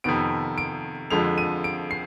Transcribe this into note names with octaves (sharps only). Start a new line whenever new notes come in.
F2 C3 D#3 B3 D7
D7
F2 D3 F3 G#3 F7
D#7
D7
C7